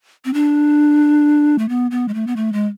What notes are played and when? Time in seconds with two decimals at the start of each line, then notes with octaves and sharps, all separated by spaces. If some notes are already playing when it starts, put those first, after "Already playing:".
0.25 C4
0.34 D4
1.59 A3
1.69 B3
1.91 B3
2.08 G#3
2.14 A3
2.27 B3
2.36 A3
2.53 G#3